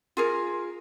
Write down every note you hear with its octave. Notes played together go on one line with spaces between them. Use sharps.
F4 G#4 A#4